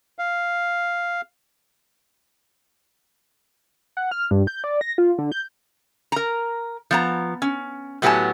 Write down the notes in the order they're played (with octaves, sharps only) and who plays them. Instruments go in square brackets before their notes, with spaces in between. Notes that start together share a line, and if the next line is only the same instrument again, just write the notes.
[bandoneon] F5
[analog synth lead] F#5
F6
G2
G6
D5
A#6
F4
D3
G6
[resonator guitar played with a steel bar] A#4 A#5
F3 B3 A#5
C#4
A2 F#3 B3 G4 G#5 A5